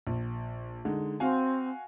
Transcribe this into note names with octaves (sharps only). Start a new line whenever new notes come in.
A#1
D3 G#3 D#4
C4 F#4 F5 G#5